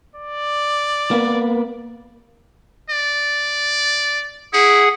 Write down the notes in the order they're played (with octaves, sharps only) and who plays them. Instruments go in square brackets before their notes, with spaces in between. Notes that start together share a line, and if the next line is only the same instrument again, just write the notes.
[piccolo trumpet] D5
[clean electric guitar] A#3 B3
[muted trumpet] D5
[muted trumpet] E4 [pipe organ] G#4 F#5